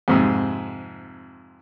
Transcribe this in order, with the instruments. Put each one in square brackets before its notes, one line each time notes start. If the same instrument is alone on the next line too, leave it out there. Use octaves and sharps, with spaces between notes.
[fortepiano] F2 G#2 C3